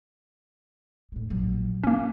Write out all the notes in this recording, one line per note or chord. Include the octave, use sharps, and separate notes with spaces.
A2 G#3
A#1 F#3
F#3 A#3 C#4